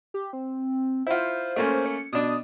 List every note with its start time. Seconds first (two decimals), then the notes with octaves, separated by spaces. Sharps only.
0.14 G4
0.33 C4
1.07 E4 F4 C5
1.56 A3 A#3 C#4
1.86 C#7
2.13 B2 D4 D#6